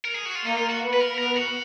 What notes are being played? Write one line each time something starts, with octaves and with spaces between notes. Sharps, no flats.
A#4
G#4
F#4
F4
A#3 D#4
F4
F#4
B3
B4
A#4
B3 A#4
F#4